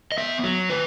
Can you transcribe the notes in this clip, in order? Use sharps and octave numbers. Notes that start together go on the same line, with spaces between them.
D#5
B3 E5
F#3
D#3 B4